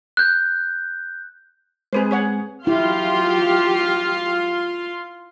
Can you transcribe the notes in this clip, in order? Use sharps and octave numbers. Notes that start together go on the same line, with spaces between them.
F#6 G6
G#3 C4 G#4 B4 C5
G#4 C#5 F#5
F#3 E4 F4 G4 F5 C6